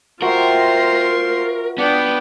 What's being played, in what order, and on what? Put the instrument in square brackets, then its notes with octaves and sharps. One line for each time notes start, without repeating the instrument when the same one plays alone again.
[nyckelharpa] F4 C6 [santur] F#4 E5 G5 [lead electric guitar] A#4 [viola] C5
[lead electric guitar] B3 [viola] D4 G5